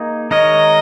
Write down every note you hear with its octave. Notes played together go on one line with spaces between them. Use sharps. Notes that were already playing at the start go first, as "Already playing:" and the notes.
Already playing: A#3 D#4 G#4
D#3 G#3 D#4 A#4 C#5 D#5